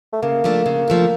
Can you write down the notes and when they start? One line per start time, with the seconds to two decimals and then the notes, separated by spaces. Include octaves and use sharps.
0.13 A3
0.22 C#3 A#3
0.44 F3 A3 D4
0.66 C#3
0.88 F3 A3 D4